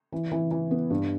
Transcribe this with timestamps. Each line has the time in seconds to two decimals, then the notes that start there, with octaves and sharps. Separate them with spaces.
0.12 E3
0.32 E3
0.51 E3
0.71 B3
0.90 G2